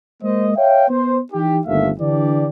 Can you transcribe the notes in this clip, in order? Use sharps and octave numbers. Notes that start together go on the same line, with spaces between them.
G#3 A#3 C5 D#5
C#5 E5 F5 G5
B3 C5
E3 D#4 G4
G1 D#2 A3 E5 F5
D3 E3 D4 G4 D5